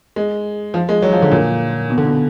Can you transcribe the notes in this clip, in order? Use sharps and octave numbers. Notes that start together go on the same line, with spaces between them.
G#3
F3
G#3
F#3
F3
D3
A#2
B2
D3
B2